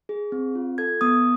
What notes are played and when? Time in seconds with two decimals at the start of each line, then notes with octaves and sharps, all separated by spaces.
0.09 G#4
0.32 C4
0.55 F4
0.78 A4 G#6
1.01 B3 D#6